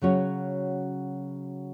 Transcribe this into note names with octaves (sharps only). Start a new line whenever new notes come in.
C#3 F#3 C#4 F#4 C#5